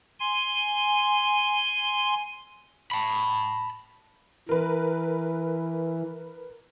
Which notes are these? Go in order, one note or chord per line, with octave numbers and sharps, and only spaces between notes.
G#5 C6
A5 B5
E3 A#4 B4